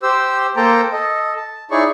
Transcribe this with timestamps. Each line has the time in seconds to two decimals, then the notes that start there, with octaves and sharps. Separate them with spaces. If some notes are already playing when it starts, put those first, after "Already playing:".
0.03 G4 C5 E6
0.56 A#3 A4 C5 G5 A5 A#5
0.93 A4 D#5
1.36 A5
1.71 D#4 E4 G#4 C#5 D5 C#6